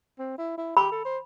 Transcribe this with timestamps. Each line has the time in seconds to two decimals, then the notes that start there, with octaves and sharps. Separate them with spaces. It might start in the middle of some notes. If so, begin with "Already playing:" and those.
0.19 C4
0.38 E4
0.57 E4
0.76 G4 B5
0.91 A4
1.05 C5